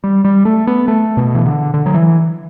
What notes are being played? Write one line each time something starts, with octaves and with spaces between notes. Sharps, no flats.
G3
G3
A3
B3
A3
B2
E3
D3
D3
F#3
E3